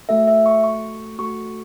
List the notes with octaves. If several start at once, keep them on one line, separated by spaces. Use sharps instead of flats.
A3 F#4 A4 E5
E5
C#6
C#6
A3 F#4 A4 C#6